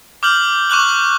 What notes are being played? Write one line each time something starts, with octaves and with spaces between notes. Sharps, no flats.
D6 F6 G6 F#7
C#6 D6 F#6 F#7